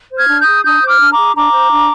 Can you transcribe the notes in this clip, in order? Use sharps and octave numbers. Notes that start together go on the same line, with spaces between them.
C5
F6 G#6
D4
D#6 G6
G#4
D4 D#6 G6
C5
D6 F6
D4
A#5 D6
G#4
D4 A#5 D6
C5
D4